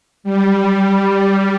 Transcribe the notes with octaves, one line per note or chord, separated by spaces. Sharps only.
G3